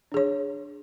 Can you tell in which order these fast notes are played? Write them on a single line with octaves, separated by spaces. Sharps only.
D4 G#4 C#5